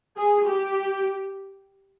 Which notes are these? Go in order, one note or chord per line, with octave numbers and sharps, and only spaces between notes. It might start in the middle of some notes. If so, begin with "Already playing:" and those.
G#4
G4